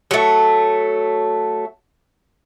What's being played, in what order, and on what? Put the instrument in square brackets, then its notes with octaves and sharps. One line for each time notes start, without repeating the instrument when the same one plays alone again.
[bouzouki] F#3 A3